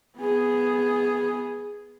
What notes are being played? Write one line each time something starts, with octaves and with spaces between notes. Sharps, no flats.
B3 G#4